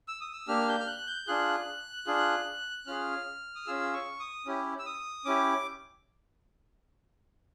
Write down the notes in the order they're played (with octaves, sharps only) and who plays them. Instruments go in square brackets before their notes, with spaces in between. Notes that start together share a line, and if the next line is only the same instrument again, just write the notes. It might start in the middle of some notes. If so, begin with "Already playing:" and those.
[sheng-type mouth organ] E6
D#6
E6
A#3 D4 G4 F6
G6
F6
F#6
G6
D4 F4 G#4 F#6
D4 F4 G#4
C#4 F4 G#4 F6
D#6
C#4 F4 G#4 E6
C#6
D#6
C#4 E4 G4
E6
D#6
C#4 E4 G4 D6